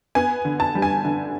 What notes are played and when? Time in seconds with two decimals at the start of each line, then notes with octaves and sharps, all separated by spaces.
0.15 B3 G#5
0.45 D3
0.60 A5
0.75 G3
0.82 G#5
1.05 D3